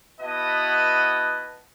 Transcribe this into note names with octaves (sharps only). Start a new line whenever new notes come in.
B3 E4 F#4 B4 D#5 A5